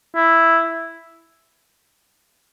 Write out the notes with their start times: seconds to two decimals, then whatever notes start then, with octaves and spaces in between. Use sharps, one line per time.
0.16 E4